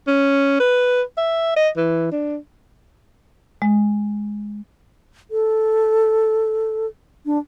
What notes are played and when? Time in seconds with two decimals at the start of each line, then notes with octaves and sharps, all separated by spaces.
0.07 C#4
0.60 B4
1.17 E5
1.56 D#5
1.77 E3
2.12 D4
3.62 G#3
5.31 A4
7.26 D4